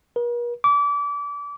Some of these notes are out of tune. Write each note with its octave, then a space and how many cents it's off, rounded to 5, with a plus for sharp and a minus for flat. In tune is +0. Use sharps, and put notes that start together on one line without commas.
A#4 +45
D6 -30